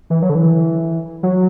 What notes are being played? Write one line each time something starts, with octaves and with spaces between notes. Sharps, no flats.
E3
F#3
D3
E3
F#3